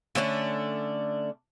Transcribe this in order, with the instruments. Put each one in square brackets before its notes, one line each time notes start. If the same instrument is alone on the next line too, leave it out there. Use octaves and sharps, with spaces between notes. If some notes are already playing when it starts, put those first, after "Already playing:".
[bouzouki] D3 A3 C#4 D4